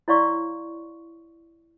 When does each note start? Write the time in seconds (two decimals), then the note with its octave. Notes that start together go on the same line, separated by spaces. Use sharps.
0.08 E4 C#5 D5 F5 C6 C#6